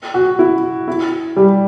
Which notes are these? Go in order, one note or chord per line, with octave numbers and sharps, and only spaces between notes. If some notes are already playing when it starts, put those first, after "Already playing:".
F#4
E4
E4
G3